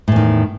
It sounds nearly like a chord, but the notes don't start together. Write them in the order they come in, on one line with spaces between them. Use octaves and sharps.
A2 E2 D#3